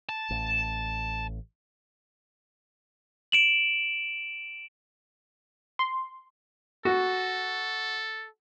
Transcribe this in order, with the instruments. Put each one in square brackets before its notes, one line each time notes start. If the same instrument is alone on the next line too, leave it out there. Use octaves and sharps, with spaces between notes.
[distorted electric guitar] A5
[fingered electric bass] A1
[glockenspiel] D7 E7 F#7
[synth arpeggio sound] C6
[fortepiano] F#4 [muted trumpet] A4